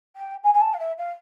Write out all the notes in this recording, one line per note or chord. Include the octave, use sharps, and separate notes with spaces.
G5
G#5
G#5
A5
F5
E5
F5